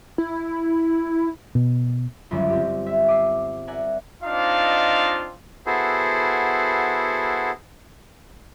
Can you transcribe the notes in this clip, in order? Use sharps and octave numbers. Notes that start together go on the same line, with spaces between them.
E4
B2
G1 C#2 F#2 D3 E5
C4 G4
E5
D6 E6 C7
A#4 D5 E5 F#5 G#5
C4 D4 D#4 F4 D#5 F5
B3 E4 F#4 G#4 A4 C5